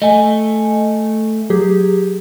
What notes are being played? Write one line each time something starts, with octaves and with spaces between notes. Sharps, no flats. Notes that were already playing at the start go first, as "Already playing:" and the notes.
A3 D#5 G#5
F#3 G4 G#4